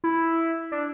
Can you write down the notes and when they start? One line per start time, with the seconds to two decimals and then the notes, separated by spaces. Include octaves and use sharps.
0.04 E4
0.72 D4